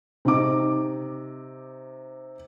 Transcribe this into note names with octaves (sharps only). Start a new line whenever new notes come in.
C3 D#4 D6